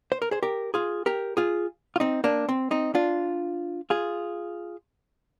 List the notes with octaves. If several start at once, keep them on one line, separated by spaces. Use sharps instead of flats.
C5
A#4
G#4 C5
G4 A#4
F4 G#4
G4 A#4
F4 G#4
F4
C4 D#4
A#3 D4
C4
C4 D#4
D4 F4
F4 G#4